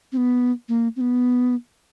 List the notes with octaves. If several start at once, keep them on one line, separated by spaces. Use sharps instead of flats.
C4
B3
A#3
C4
B3